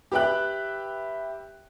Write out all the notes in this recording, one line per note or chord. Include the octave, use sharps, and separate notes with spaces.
G4 B4 E5 G5 F#6